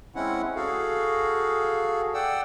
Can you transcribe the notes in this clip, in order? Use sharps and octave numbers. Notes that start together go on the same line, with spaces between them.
G#3 C4 C#4 E4 F#5
F#4 G#4 A4 F5
D5 F#5 G5 E6